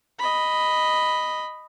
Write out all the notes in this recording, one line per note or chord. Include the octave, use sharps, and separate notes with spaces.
D#5 B5